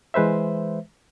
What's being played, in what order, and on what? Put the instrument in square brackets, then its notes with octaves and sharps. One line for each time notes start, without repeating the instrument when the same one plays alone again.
[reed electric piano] E3 G#3 B4 C5 E5